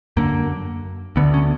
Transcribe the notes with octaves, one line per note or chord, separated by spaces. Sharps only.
F#2 D3 A#3
D2 D3 B3
C#4